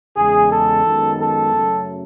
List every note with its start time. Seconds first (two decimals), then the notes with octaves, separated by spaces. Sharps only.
0.15 E2 C#3 G#3 G#4
0.49 A4
0.84 F#2 D#3 G#3 B3
1.18 A4
1.52 F#2 C#3 F#3 A3